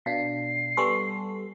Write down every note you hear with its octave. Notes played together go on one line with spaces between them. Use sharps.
B2 D4 F5 C7
G3 B3 A4 G#5 C6 C#6